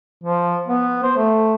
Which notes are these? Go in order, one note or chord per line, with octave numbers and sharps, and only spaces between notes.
F3
B3
C5
A3